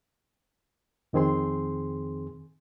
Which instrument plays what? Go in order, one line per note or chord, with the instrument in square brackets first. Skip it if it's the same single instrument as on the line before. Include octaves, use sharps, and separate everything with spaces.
[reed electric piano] F2 D#3 C4 G#4 C6